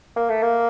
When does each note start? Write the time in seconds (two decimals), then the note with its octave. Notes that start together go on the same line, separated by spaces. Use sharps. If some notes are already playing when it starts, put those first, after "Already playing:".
0.16 A#3
0.29 A3
0.43 A#3